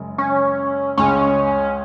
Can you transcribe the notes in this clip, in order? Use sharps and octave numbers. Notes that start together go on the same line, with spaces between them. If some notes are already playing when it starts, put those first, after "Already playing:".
Already playing: F#1 F#2 C#3 G#3
C#4
C#2 C#3 G#3 C#4